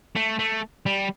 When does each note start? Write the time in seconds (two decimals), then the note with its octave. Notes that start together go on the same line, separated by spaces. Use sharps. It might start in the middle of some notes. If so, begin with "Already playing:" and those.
0.16 A3
0.39 A3
0.86 G3